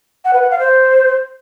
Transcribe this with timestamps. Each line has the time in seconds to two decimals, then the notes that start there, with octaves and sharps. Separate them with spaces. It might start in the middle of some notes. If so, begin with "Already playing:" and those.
0.25 F#5
0.33 B4
0.42 F#5
0.51 F5
0.59 C5